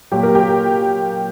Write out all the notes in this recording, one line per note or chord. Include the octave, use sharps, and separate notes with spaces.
A#2 F#3 G4
A#4
G4